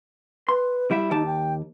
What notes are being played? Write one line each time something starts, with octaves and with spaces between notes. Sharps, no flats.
B4 C6
G3 E4 E5
D#2 D#4 G4 A5
G5